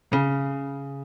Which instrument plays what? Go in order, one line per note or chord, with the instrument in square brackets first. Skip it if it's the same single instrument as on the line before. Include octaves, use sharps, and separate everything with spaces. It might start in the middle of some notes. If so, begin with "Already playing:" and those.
[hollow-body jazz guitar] C#3